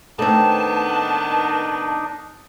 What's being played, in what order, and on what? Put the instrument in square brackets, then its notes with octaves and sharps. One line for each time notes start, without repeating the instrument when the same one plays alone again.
[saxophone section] A2 D#3 B3 [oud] A3 C4 [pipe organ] D4 D#4 [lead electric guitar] A5